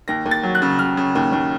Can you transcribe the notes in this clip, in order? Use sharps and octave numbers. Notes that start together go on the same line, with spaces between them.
D#2 A#6
D#2
A6
F#3
F#6
C#3
C#3 F6
C#3
D#2
D#2